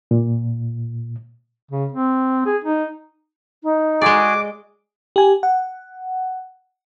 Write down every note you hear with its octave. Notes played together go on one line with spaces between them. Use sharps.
A#2
C#3
C4
G#4
D#4
D#4
G#3 F#4 G#4 D5 D6
G4 G#5
F#5